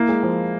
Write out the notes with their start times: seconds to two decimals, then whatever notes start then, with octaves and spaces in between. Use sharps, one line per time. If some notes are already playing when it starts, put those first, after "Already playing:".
Already playing: A#3 E4
0.09 G#3
0.23 F3